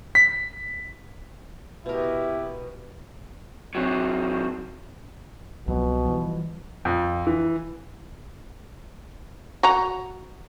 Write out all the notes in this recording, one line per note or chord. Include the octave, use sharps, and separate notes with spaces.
B6
B2 E4 G4 A#4
C3 F#3
C2 B2 F3 F#3
E3 F3 G3
F2
E3
F#4 F#5 A#5